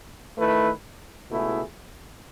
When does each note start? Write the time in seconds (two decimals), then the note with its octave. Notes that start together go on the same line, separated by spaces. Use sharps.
0.38 D#3 A3 E4 B4
1.29 C#2 B2 A3 E4 G#4